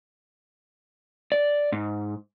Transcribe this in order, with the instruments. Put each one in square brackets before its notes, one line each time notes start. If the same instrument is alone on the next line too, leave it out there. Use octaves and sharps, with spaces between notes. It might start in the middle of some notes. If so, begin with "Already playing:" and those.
[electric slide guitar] D5
G#2